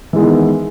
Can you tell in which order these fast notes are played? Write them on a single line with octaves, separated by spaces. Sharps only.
E3 G#3 B3 D#3